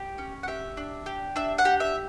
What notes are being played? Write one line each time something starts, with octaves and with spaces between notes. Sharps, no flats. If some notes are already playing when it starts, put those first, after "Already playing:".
Already playing: G4
C#4
F#5
G4 E5
D4
G4
D4 E5
F#5
G4
E5